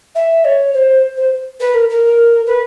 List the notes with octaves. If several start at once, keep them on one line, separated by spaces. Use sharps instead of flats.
E5
C#5
C5
C5
B4
A#4
A#4
B4